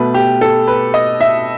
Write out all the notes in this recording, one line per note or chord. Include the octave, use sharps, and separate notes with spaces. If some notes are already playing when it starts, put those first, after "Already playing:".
Already playing: B2 A3 B4
G4
A4
B4
D#5
E5